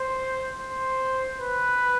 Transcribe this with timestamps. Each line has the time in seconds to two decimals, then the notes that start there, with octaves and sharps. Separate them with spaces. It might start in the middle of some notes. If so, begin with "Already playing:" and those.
Already playing: C5
0.58 C5
1.39 B4